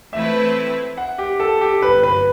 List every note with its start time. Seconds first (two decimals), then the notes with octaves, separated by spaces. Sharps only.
0.12 E3 A3 C4 E4 B4 E5
0.97 F#5
1.18 G4
1.40 A4
1.61 G4
1.82 G1 F#2 F#3 B4
2.03 B4